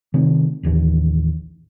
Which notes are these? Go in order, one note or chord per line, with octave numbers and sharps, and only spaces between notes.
C3 D#3 A3
A1 D#2 D#3 E3